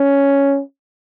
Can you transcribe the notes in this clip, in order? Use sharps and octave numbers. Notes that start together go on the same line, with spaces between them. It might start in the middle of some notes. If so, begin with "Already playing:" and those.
Already playing: C#4